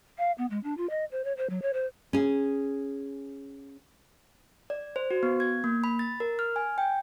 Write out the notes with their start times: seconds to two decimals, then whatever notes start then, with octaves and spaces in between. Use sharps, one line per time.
0.18 F5
0.38 B3
0.50 G#3
0.64 D4
0.77 F4
0.90 D#5
1.11 C5
1.24 C#5
1.37 C5
1.50 F#3
1.62 C#5
1.73 C5
2.13 C#4 G#4
4.70 D5
4.96 C5
5.11 F#4
5.23 B3
5.40 G#6
5.64 A#3
5.84 B5
5.99 A6
6.20 A#4
6.39 F6
6.56 G#5
6.78 G5